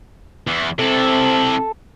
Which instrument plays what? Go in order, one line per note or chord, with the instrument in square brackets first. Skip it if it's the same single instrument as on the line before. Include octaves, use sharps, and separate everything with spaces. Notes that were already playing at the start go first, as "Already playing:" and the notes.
[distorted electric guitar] E2 E3
[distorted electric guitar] C3 E4 [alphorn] C4 [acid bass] A4